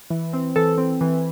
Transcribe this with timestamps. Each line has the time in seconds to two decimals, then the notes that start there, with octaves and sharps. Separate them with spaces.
0.10 E3
0.33 C4
0.56 E3 A4
0.78 C4
1.01 E3